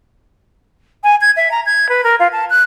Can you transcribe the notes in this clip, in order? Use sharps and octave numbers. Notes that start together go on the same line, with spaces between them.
G#5
G#6
E5
A#5
G#6
B4
A#4
F4
A5
F#6